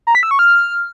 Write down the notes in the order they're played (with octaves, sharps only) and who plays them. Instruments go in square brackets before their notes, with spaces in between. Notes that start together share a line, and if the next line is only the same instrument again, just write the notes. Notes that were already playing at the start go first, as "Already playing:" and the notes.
[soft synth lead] A#5
B6
E6
C#6
F6